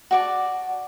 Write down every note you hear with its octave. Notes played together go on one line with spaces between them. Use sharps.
F#4 D5 A5